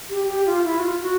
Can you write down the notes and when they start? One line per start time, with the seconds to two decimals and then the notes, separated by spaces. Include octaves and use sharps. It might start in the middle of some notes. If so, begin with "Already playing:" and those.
0.10 G4
0.28 G4
0.47 F4
0.64 E4
0.79 F#4
0.83 F4
1.01 F#4